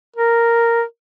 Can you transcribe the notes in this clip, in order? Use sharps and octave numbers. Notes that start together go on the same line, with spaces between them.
A#4